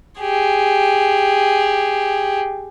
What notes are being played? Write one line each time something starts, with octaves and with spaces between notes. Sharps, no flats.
G4 G#4